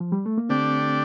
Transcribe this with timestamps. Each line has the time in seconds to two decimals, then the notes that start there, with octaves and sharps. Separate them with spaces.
0.00 F3
0.12 G3
0.26 A3
0.38 A#3
0.49 D3 A3 C4 D4 G4 D5